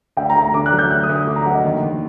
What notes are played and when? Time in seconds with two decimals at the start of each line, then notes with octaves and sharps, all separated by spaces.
0.17 D2 G5
0.30 A#5
0.36 D2
0.42 A#5
0.54 D3 D6
0.66 F#6
0.72 F#3
0.79 G6
0.90 D2 F#6
1.03 D#6
1.09 D2
1.15 D#6
1.27 D3 D6
1.36 A#5
1.46 F#3 F#5
1.55 D#5
1.64 D#2
1.83 D#2